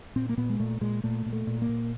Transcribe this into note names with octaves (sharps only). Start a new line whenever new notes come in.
A#2 C4
A#3
A#2 B3
G#3
A#2 A3
A#2 G#3
A#2 A3
A#2
A3
A#2
A#3
A#2